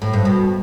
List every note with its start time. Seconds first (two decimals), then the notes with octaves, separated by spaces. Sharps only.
0.02 A2
0.13 G2
0.25 B2